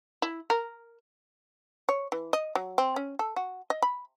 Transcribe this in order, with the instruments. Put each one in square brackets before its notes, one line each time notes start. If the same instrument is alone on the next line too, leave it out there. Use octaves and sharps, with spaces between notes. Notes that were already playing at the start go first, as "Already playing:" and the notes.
[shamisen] E4
A#4
C#5
E3
D#5
F#3
C4
C#4
A4
F#4
D#5
B5